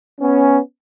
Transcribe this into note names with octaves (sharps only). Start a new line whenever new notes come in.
B3 C#4